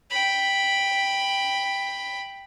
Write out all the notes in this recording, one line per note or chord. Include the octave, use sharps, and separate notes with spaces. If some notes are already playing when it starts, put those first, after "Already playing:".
G5 B5